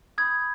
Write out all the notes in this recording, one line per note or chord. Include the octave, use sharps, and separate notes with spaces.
B5 D#6 G6 G#6